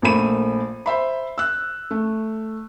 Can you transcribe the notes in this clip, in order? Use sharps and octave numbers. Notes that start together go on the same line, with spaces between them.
A#1 A#2 A3 B5 D#7
C5 E5 B5
E6 F#6
A3